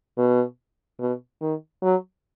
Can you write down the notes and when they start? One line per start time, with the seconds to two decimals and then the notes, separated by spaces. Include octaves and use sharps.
0.18 B2
1.00 B2
1.41 D#3
1.82 F#3